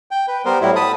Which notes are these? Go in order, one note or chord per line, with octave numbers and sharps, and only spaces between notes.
G5
B4
G3 B3 A#4 C5
A2 F#3 G3 E4
A5 B5 D#6